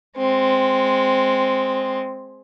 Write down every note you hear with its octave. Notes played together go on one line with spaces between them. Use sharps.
G#3 C4